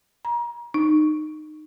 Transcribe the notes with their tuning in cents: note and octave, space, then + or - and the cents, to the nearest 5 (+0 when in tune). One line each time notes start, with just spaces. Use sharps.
A#5 +35
D#4 -20